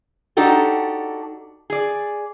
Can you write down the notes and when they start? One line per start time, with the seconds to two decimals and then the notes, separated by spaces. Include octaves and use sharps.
0.37 D4 D#4 F#4 G4 A4
1.70 G#4 D5